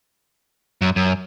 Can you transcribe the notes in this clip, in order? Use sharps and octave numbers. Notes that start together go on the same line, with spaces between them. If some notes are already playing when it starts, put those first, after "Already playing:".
F#2
F#2